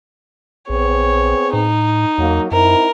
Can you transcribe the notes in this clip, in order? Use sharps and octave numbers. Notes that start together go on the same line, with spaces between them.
A#1 B3 C4 G#4 C#5
A2 D#4
E2 F#3 A#3
F#2 C4 D#4 E4 A#4